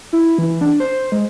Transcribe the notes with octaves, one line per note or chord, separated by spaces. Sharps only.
E4
E3
D4
C5
G#3